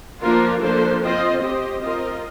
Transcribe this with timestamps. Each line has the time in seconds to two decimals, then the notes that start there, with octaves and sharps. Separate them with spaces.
0.20 F3 A#3 D4 F4 A#4
0.61 F3 A#3 D4 A4 C5
1.01 C4 F4 C5 D#5
1.42 C4 G4 C5 D#5
1.82 C4 F4 A#4 D#5